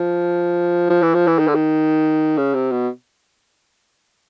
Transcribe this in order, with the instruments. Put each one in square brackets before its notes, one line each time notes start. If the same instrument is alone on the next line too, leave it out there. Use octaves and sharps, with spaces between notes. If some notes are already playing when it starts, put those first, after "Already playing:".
Already playing: [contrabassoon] F3
F3
E3
F3
E3
D#3
D3
D#3
C#3
C3
B2